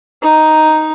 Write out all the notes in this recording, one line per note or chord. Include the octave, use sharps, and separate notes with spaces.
D#4